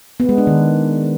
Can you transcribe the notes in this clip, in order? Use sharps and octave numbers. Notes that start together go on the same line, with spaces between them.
B3
G#3
D4
D#3